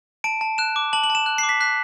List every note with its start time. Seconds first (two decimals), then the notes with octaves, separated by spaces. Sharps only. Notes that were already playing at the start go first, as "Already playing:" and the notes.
0.24 A5 D7
0.41 A5
0.58 F#6 E7
0.76 D6
0.93 A5 F#7
1.04 F#7
1.10 A5
1.15 E7
1.26 F#6
1.38 D6 C7
1.49 B6
1.61 F#6 B6